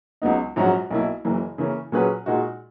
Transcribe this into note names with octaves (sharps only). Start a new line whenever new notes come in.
C#2 C#3 F#3 B3 D#4
A#1 G#2 F#3 C#4 F#4
B1 B2 A#3 E4
F#1 F#2 E3 A#3
C#3 E3 A#3 C#4
A#2 F#3 C#4 G#4 B4
A#2 G#3 D#4 F#4